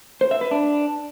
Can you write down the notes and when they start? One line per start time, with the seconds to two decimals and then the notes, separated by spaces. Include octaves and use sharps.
0.21 C5
0.31 E5
0.41 B4
0.51 D4